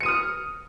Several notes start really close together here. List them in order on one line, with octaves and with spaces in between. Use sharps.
C#7 D#7 D#6 F6